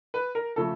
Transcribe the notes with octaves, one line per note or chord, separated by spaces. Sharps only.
B4
A#4
C#3 F3 A3 A4